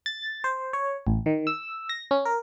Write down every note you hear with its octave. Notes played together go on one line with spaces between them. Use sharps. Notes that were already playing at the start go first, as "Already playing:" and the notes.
A6
C5
C#5
A1
D#3
E6
A#6
C#4
A#4